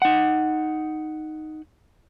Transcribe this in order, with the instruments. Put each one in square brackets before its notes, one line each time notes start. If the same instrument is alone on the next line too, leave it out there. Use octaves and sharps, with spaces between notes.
[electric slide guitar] D#4 F#5